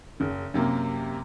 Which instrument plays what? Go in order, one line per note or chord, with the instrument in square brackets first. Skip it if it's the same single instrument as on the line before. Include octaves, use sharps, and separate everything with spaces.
[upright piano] F#1 C#3
F#2 C3 A#3